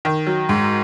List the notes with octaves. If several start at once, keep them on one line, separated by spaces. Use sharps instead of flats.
D#3
F#3
G#2